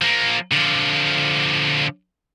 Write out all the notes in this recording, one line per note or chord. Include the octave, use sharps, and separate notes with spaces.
F3 A#3
D3 F3